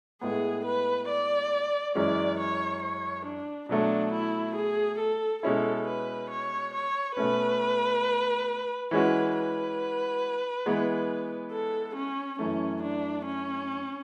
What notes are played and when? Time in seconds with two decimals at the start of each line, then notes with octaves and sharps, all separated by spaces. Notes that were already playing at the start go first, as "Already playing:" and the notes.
0.21 A2 G#3 B3 G#4
0.65 B4
1.09 D5
1.95 F#2 E3 G#3 C#4 D5
2.40 C#5
2.83 C#5
3.26 D4
3.69 B2 F#3 A3 D4
4.13 E4
4.56 G#4
4.99 A4
5.43 B2 G#3 C#4 E4 A4
5.87 B4
6.31 C#5
6.74 C#5
7.17 B2 A3 C#4 B4
8.91 E3 G#3 C#4 F#4 B4
9.35 B4
10.66 E3 G#3 B3
11.52 A4
11.96 C#4
12.39 F#2 E3 A3 C#4
12.83 D4
13.26 C#4